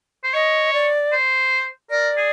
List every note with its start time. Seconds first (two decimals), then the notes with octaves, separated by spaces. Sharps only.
0.24 C5
0.34 C#5 D#5
0.73 D5
1.12 C5
1.90 A#4 D5
2.17 G#4